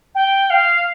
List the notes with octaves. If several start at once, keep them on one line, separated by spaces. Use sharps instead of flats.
G5
F5